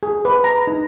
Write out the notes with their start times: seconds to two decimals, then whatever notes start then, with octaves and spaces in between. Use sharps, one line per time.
0.03 G#4
0.25 B4
0.44 A#5
0.67 D#4